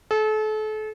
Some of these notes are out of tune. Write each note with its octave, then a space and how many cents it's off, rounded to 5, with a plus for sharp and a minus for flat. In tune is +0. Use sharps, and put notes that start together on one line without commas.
A4 -35